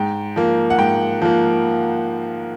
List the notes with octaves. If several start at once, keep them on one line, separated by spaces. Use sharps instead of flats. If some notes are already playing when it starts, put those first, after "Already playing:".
Already playing: G#2 G5
F3 A#3
F#5
G#2 G5
F3 A#3